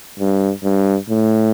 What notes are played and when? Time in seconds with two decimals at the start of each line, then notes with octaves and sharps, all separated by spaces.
0.20 G2
0.64 G2
1.09 A2